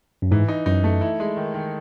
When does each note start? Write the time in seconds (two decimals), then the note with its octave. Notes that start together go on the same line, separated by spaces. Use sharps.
0.22 F#2
0.31 G#2 E3
0.48 D#4
0.66 F#2 D#4
0.84 A3
1.01 E4
1.20 G#3
1.37 D#3
1.54 D#3